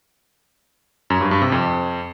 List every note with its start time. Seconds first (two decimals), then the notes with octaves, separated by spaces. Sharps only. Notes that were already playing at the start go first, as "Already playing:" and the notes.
1.10 F#2
1.21 G2
1.31 G2
1.42 C3
1.52 F2